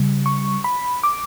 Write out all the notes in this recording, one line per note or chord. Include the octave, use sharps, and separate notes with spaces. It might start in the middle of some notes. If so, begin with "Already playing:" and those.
Already playing: C#3 G3
C#6
B5
D6